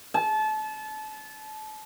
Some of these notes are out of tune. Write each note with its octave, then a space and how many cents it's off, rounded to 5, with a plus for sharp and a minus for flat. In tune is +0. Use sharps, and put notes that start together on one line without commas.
A5 -30